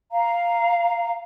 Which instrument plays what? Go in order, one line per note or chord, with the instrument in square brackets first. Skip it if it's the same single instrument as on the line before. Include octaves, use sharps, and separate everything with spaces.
[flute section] F5 A#5